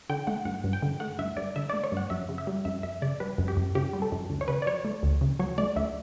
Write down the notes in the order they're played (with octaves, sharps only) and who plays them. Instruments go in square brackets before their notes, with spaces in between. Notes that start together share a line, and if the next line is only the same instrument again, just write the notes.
[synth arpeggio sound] D3 G5
A3 F#5
G2 F#5
G2
G5
D3
A3 F#5
G2 E5
G2 D5
D3 E5
A3 D5
C#5
G2
F#5
F#2 E5
C#3
E5
G3
F#2 E5
F#2 E5
C#3 D5
G3 B4
F#2
G4
F#2
C#3 G4
G3
A4
F#2
D2
C#5
C#3 B4
D5
F#3 C#5
A3
D2
C#3
F#3 C#5
A3 D5
D2 E5